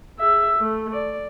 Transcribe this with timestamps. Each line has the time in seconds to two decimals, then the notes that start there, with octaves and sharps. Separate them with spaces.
0.19 G#4 E5
0.59 A3
0.93 D5